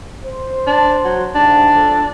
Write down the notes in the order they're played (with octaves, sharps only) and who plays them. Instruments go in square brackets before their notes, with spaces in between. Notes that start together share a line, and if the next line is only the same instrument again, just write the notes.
[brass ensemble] C5
[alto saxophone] D4
F#3
[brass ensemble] G#2 C3 [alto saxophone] D4
[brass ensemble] F3 A4